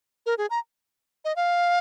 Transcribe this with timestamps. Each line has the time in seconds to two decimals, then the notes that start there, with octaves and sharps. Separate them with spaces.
0.26 A#4
0.38 G#4
0.50 A#5
1.25 D#5
1.36 F5